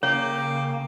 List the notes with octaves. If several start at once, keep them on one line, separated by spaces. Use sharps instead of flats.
C#3 A#3 G4 C#5